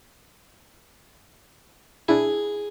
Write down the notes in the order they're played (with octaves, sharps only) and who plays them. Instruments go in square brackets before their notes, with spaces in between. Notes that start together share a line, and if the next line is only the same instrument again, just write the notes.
[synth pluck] D4 E4 [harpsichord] G#4